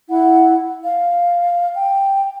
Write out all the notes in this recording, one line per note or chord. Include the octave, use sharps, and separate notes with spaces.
E4 F#5
F5
G5